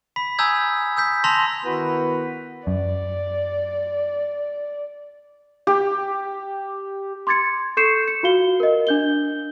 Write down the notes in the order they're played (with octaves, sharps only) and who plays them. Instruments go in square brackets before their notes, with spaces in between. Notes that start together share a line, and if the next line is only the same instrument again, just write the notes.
[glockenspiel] B5 B6
G#5 A#5 D#6 E6 G6 G#6
D#6 E6 G6 B6
A5 A#5 C6 E6 A#6 F7
[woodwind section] D#3 B3 E4 F#4 B4
[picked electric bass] F#2 [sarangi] D5
[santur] G4
[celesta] C6 D6 G#6 A6 C#7
A4 C#6 G6 C7 C#7 E7
C#7
F4 F#4 F5 G7
A#4 D#5
D4 G6 G7